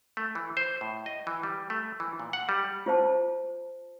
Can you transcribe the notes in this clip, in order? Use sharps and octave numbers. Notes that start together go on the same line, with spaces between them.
A3
E3
C5
A2
D#5
E3
G3
A3
E3
A#2
F#5
G3
F4 C5 A5